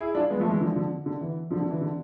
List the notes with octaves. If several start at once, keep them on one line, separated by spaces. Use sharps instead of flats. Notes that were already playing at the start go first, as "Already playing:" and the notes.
E4 G#4
D4 F4
G#3 B3
F3 A3
E3 G#3
D3 F3
D3 F3
D3
E3
D3 F3
D3
E3
D3